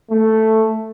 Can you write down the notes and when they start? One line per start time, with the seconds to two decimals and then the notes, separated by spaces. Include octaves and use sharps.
0.11 A3